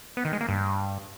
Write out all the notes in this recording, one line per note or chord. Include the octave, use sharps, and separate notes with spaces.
B3
D#3
G#3
A#3
G2